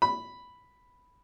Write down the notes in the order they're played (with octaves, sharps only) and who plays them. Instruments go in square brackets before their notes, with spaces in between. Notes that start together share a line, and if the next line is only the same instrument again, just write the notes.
[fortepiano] B5